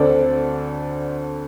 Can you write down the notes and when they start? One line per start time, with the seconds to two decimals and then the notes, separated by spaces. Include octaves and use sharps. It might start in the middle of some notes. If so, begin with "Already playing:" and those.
Already playing: D2 D3 C4 A4 D5